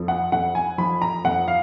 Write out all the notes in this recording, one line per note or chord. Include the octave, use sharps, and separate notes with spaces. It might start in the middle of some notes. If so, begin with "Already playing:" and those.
Already playing: F2 F3
F#5
F2 F#5
G#5
F3 B5
A#5
F2 F#5
F5